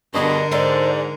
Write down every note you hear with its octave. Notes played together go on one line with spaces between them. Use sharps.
G2 B2 D3 G#4 A#4 D#5
G#2 D#4 A4 C5 D5